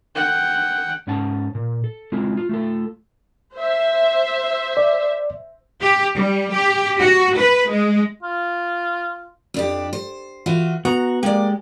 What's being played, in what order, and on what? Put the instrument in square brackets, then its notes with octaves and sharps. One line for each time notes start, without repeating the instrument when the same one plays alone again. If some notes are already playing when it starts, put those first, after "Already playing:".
[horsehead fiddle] F#5 G5
[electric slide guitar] G#2 C#4 F#5 A5
A#2
A4
G#3 C4 E4 F4
F4
A3 F4 A4
[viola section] C5 E5
[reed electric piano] D5
[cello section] G4
G3
G4
F#4
B4
G#3
[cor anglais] F4
[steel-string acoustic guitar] F2 D4 G4
C5
E3 F4 F#4
[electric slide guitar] B3 F#4 [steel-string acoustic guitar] A#5
[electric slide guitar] G#3 G4 [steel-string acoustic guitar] A#3 D5